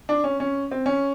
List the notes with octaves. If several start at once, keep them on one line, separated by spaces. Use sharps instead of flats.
D4
C#4
C#4
C4
C#4